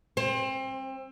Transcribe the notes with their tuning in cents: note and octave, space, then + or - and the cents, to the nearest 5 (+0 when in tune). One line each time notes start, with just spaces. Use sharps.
C4 +30